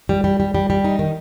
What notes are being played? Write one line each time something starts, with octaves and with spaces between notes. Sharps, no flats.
G3
G3
G3
G3
G3
D#4
D#3